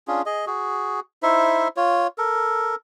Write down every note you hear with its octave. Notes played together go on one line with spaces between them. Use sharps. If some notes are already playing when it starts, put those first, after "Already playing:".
C#4 D4 F4 G#4
G#4 D#5
F#4 G#4
D#4 E4 C5 E5
F4 C#5
A4 A#4